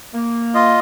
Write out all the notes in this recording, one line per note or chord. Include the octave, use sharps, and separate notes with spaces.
A#3
F4 D#5